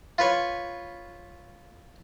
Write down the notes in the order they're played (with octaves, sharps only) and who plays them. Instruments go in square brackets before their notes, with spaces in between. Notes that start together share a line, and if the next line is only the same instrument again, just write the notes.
[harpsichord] F4 B4 C#5